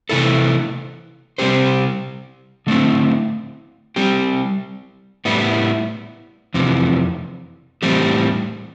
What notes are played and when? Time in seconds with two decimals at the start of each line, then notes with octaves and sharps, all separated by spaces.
0.09 C3 E3 A3 E4 A4
1.38 C3 G3 C4 G4 C5
2.67 D3 A3 C4 E4
3.96 G3 C4 G4
5.25 A2 G3 B3 E4
6.54 F2 C3 E3
7.82 A2 E3 G3 C4 G4